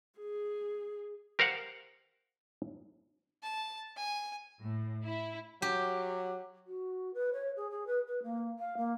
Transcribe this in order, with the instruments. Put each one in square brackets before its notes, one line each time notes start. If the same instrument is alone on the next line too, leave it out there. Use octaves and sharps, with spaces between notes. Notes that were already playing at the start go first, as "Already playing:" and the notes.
[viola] G#4
[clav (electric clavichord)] G4 A#4 C5 F5 F#5
[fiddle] A5
G#5
[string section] A2
E4
[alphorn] F#3 [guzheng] G4
[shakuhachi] F#4
B4
C#5
G#4
G#4
B4
B4
A#3
F5
A#3